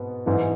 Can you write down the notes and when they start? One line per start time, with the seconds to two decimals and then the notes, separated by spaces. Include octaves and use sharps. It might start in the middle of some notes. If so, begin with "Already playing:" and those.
Already playing: G#2 B2 B3
0.26 G#2 E3